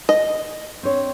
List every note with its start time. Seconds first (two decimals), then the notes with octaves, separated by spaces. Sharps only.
0.09 D#5
0.83 C4 D4 C#5